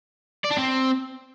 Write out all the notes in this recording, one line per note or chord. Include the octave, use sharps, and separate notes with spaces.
D5
D4
C4